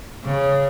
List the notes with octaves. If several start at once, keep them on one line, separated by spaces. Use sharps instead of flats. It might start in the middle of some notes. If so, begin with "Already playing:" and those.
C#3